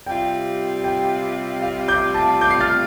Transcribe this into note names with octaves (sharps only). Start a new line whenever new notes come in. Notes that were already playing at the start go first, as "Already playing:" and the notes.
C3 G3 F4 G5
G5
F5
D6 G6
A5 D6
D6 G6
C7
F6 A6